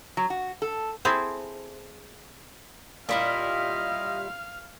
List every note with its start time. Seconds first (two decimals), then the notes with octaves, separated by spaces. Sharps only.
0.17 F#3
0.30 F#4
0.62 A4
1.05 C4 E4 G#4 A4 C5
3.09 A#2 G3 E4 F4 D#5 F5 F6